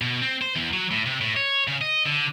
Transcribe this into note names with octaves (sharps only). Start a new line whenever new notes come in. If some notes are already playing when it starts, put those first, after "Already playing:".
B2
C4
C5
E2
F#3
A2
C3
A2
C#5
C#3
D#5
D3